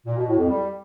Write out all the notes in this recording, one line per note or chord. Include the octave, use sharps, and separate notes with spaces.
A#2
B2
A2
F2
G3